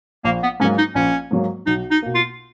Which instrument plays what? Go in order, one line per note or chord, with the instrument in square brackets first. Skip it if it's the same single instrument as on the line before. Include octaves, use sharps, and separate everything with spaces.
[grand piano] A#1 [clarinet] A#3
[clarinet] B3
[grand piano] G#2 F#3 A#3 [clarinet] C#4
[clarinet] D#4
[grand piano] A#1 [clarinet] C#4
[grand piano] G#2 F#3 A#3
[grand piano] B1 [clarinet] D#4
[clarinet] D#4
[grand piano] B2 A#3
[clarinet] F4